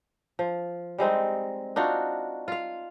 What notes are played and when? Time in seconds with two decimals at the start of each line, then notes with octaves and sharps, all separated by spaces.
0.39 F3
0.98 G3 G#3 C4 D#4
1.76 D4 D#4 F4 F#4
2.48 F4 F5